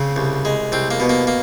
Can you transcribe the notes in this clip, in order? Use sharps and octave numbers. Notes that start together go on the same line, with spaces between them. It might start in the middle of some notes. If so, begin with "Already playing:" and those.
Already playing: C#3 C4
C2
G#3
C2 C4
A#3
B2
A#3
A#3